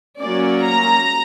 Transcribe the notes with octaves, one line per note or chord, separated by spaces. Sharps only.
F#3 A#3 C#4 D5
A#5